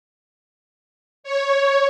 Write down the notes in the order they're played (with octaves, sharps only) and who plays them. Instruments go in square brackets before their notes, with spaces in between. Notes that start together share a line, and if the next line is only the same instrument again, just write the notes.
[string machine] C#5